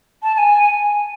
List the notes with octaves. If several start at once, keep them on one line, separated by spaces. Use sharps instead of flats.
A5
A5
G#5